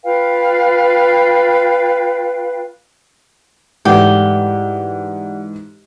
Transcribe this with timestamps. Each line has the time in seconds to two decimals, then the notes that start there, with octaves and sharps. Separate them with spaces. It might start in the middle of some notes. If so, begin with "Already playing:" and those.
0.03 F4 B4 F5 G5
3.85 G#2 E3 A3 G4 D5 F#5